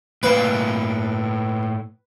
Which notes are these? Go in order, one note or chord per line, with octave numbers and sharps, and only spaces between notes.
A2 A#3 B4 F5